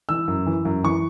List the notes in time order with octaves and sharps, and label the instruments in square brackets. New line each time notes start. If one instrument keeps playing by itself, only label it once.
[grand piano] E3 E6
F#2
E3
F#2
E3 C#6